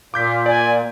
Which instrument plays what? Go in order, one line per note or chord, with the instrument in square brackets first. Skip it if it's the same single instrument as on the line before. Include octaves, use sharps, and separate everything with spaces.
[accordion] A#2 [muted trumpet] F4 [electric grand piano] D6 G6 B6
[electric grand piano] D5 [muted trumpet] G#5